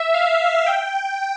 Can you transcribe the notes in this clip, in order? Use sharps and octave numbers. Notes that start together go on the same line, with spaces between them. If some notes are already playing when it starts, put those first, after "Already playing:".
Already playing: E5
F5
G5